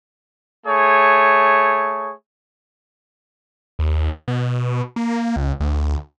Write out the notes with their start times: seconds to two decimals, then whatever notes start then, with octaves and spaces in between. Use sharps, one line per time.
0.66 A3 G#4 C#5
3.79 D#2
4.28 B2
4.96 A#3
5.36 C#2
5.60 D2